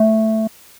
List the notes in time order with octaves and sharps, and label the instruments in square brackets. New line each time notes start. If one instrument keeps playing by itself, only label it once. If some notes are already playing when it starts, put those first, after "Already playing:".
Already playing: [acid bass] A3